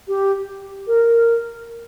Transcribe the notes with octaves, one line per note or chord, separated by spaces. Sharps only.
G4
A#4